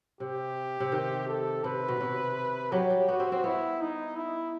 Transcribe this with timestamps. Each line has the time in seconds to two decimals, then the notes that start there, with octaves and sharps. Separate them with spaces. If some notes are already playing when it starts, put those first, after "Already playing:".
0.20 C3 G4
0.80 C3
0.92 D#3
1.28 A4
1.64 C3 B4
1.88 B2
2.01 C3
2.72 F#3 G4
2.90 G3
3.08 B3 F#4
3.20 C4
3.32 C4
3.44 B3 E4
3.81 D#4
4.16 E4